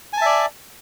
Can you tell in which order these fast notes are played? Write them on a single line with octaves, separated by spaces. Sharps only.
G#5 A5 E5 D5